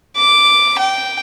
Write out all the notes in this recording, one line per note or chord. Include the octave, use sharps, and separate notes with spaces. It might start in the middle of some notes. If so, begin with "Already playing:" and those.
D6
G5